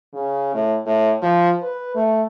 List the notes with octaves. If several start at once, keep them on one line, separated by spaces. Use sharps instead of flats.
C#3
A2
A2
F3
B4
A3